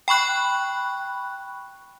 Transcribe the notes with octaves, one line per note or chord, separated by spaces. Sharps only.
G5 B5 C#6 F#6